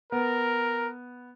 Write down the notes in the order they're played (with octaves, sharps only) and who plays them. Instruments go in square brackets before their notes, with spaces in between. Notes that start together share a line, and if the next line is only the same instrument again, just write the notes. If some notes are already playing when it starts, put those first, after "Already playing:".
[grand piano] B3 [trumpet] A#4